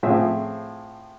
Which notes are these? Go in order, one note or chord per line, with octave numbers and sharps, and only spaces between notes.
A2 F3 C4 G#4 E5